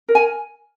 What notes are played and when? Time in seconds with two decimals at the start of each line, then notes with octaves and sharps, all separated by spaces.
0.08 A#4
0.15 G#5